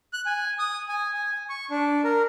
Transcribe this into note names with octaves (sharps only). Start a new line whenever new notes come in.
F#6
G#5
D#6
G#5
G#5
C#6
D4
A#4